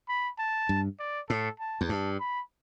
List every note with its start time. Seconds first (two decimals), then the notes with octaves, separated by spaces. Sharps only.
0.09 B5
0.39 A5
0.69 G2
0.99 D5
1.29 A2 A4
1.59 A5
1.81 E2
1.89 G2 A5
2.20 B5